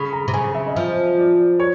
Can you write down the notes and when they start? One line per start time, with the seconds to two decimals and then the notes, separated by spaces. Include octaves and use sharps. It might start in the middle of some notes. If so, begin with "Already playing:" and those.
Already playing: C#3 B5
0.13 A#5
0.28 C3
0.33 C#3 G#5
0.55 E5
0.66 D#5
0.75 F3 E5
1.18 D5
1.60 C#5